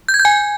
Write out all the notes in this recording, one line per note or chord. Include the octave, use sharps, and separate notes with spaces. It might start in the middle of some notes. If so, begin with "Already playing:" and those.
G6
G#6
G6
G#5